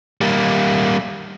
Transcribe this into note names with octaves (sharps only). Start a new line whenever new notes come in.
G3 A#3